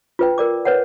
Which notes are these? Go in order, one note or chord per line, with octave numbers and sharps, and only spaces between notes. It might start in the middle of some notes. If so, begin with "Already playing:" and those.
F4 B4 G5
A#4 D5 D6
B4 C#5 F#5